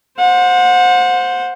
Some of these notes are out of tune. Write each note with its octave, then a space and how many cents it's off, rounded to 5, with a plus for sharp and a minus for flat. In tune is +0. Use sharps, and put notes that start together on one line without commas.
C5 +0 F#5 -30